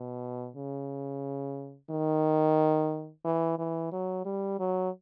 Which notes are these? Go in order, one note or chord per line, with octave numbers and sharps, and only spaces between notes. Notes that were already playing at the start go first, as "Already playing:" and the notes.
Already playing: B2
C#3
D#3
E3
E3
F#3
G3
F#3